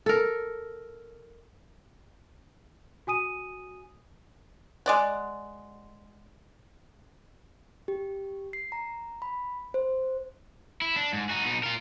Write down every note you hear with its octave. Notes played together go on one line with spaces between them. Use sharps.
A4 A#4
F#4 G#5 D#6 D#7
G#3 D5 F#5
G4
C7
A#5
B5
C5
E4
D4
G#2
D#4 F#4
B2 D#4
F4 A#4